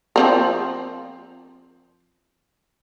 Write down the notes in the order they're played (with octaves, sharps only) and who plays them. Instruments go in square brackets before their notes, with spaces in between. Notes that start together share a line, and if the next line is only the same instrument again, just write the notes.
[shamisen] F3 C4 A#4